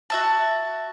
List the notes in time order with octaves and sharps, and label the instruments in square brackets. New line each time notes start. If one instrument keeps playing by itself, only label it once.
[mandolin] F#4 E5 A5